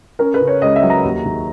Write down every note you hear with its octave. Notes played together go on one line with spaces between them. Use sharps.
C#4 A#4
B4
C#3
C#5
C#2 D#5
E5
F#3
A#5
D#2
D#3